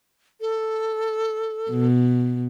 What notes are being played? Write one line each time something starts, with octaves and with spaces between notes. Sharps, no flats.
A4
B2